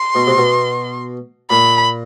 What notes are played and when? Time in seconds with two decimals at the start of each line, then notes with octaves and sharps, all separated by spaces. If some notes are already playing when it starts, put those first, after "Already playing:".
Already playing: C6
0.15 B2
0.27 C3
0.37 B2
1.50 A#2 B5